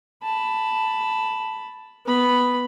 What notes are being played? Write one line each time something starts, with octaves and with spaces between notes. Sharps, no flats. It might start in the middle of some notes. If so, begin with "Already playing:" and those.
A5 B5
B3 B5